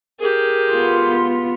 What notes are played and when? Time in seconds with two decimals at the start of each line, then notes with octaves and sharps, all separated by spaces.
0.20 G4 G#4 A#4
0.71 B3 F4